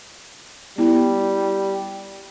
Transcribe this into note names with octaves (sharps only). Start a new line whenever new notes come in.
G3 B3 E4